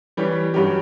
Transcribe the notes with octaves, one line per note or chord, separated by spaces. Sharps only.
E3 G3 C#4 G4
G2 F#3 C#4 G4